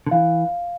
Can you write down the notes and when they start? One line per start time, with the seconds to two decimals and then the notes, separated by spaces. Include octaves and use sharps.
0.07 D3
0.11 E3 F5